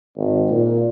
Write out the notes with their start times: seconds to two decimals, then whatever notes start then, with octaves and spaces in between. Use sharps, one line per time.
0.17 G#1
0.50 A#2